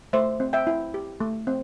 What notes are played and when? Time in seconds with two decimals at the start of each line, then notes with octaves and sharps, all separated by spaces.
0.13 A3 C5 E5
0.40 C4
0.53 E5 G5
0.67 E4
0.94 G4
1.20 A3
1.47 C4